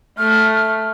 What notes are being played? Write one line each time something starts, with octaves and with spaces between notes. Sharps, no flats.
A3 F6